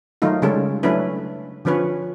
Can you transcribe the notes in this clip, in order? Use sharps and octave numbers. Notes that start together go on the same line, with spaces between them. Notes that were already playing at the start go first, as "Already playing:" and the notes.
D#3 F#3 A3 D#4 F4
C#3 G3 G#3 C#4 A4
F#3 A3 C#4 D4 E4 B4
D3 F3 C#4 B4 C#5